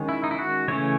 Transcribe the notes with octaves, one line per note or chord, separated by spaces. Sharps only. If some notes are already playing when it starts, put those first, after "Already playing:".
Already playing: D#3 G#3 C#4
E4
D#4
E4
F#4
C#3 E3 A3 C#4 C#5